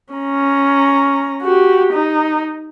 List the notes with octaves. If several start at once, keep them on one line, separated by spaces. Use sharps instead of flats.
C#4 A#5
F#4 G4
D#4